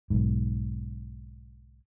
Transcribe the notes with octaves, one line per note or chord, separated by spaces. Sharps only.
B1 G#2